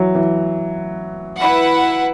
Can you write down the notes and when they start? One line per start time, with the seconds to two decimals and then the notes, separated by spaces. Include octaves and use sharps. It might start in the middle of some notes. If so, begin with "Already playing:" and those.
Already playing: E3 F#3
0.15 E3
1.38 E4 B4 F#5